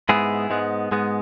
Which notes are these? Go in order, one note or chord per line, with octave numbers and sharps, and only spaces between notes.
G#2 G#3 B3 E4 G#4
G#2 G#3 B3
G#2 G#3 B3